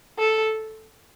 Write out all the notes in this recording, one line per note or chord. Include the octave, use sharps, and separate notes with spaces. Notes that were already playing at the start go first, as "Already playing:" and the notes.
A4